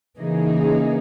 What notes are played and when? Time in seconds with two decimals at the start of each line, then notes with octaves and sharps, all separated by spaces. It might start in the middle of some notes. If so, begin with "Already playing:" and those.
0.18 C#3 E3 A#3 D#4 G#4